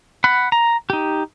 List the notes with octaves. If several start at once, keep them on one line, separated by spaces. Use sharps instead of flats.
F#5 B5
A#5
D#4 G4